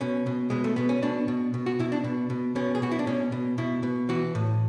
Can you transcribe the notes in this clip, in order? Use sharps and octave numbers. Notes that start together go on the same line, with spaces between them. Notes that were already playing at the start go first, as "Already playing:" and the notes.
B2 C#4
B2
B2 G#3
A3
B2 B3
C#4
B2 D4
B2
B2
F#4
B2 E4
D4
B2
B2
B2 C#4
G#4
B2 F#4
E4
D4
B2 C#4
B2
B2 E4
B2
E3 F#4
A2